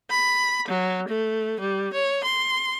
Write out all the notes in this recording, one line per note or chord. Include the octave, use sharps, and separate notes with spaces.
B5
F#3
A3
G3
C#5
C6